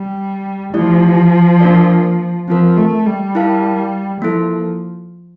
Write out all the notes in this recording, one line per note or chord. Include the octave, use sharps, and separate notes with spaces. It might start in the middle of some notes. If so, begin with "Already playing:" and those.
Already playing: G3
F3 A3 E4 G4 D5
A#3 D4 F4 A#4 D5
F3 C4 F4 A#4
A3
G3
E4 A#4 F5 A5
F3 A#3 E4 A4